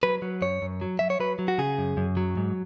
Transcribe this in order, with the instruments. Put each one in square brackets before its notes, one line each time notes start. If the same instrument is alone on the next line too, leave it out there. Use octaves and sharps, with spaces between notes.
[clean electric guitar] F#3 B4
F#3
F#2 C#5
F#2
F#3
F#3 E5
C#5
F#3 B4
F#3
F#4
C#3 G#4
F#2
F#2
F#3
G#2